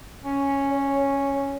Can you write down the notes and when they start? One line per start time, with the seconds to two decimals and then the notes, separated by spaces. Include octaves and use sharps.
0.23 C#4
0.71 C#5